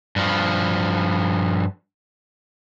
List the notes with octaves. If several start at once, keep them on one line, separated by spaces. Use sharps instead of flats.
G2 F3